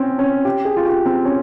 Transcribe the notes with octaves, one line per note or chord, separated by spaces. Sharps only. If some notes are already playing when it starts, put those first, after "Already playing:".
Already playing: C4 C#4
C#4
G4
G#4
F4
G4
C4
C#4